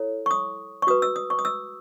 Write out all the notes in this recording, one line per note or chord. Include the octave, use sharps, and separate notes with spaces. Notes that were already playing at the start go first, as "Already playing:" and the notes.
Already playing: E4 A4 C#5
C#6
D#6
C#6
F#4 B4 D#6
E6
D#6
C#6
D#6
E6